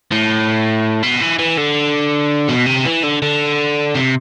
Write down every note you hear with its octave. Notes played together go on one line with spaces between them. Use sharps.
A2
B2
E3
E3
D3
B2
C3
E3
D3
D3
C3